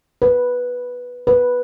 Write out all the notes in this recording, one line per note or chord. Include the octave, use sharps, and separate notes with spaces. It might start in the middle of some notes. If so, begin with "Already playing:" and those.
B4
B4